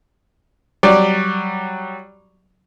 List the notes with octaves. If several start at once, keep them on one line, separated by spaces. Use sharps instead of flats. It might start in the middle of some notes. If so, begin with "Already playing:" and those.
F#3 G3 D5